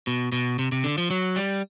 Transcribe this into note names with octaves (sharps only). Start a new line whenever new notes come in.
B2
B2
C3
C3
D3
F3
F#3
G3